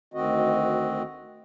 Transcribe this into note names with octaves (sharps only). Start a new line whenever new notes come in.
D2 D#3 C4 F#4 D#5